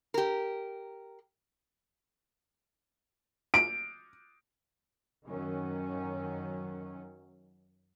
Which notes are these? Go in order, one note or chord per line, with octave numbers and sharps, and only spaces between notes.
G4 A#4
D7
F#2 D#3 F#3 C#4